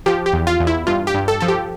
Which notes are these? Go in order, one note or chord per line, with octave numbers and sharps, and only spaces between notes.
F3 G4
G4
E2
F4
E2
E4
G2 F4
G4
G2
A4
F3 A4
G4